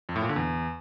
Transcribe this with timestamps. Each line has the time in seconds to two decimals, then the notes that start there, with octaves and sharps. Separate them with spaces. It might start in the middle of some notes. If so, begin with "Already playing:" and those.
0.09 F2
0.16 A2
0.22 A#2
0.29 D3
0.36 E2